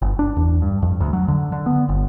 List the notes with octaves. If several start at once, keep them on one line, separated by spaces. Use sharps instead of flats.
G1
D4
E2
G2
F2
D2
F#3
D3
D3
B3
G1